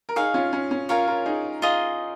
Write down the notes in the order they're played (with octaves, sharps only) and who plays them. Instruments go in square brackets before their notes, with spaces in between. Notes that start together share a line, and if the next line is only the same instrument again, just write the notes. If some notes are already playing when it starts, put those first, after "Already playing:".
[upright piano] A#4
[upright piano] D#4 G#4 [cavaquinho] C#5 F5 G#5
[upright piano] C#4 F4
C#4
C#4
[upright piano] F4 A#4 [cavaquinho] C#5 F5 G#5
[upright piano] F4 A#4
D#4 G#4
[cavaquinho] F4 G#4 D#5